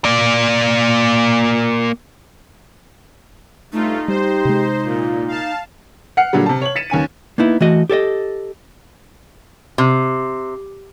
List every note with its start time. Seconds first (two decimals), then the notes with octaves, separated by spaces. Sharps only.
0.05 A#3 D5
3.73 G2 A3 D#4 F4
4.08 G3 G4 C5
4.45 C3 G#3
4.85 A#2 F4
5.28 F5 A5
6.17 F#5 F6 C7 C#7
6.33 A#2 D3 F#3 G3
6.46 C3 A5
6.62 C#5 F#7
6.75 A6 B6 C#7 D#7 E7
6.90 D#2 C#4 G#5 D#7
7.38 A#3 B3 D#4 E4
7.61 E3 A3 F#4 D#5
7.90 G4 A4 C#5 D#5
9.78 C3